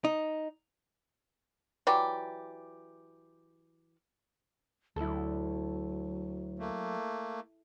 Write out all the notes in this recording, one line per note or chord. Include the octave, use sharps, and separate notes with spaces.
D#4
E3 F#3 G4 D5
D2 F#3 E4 A4
A3 A#3